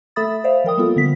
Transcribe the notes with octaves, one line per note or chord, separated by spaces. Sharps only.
A3 A4 E5 B5 D#6 A6
C5 D5 E5 F5
F3 A#4 G5 D#6
G3 A#3 B3 F4 A4
D3 B3 B6